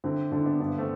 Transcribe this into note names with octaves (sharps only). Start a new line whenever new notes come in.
D3 C4 E4
D3 D4
E4
B3 D4
G2 B3 D4
A3 C4